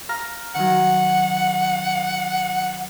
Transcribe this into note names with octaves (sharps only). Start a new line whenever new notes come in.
F5 A#5 F6
D#3 F#3 F#5